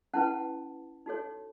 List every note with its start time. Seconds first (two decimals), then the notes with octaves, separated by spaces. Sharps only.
0.14 C#4 E4 B4 F#5 A5
1.06 D#4 F#4 A4 C#5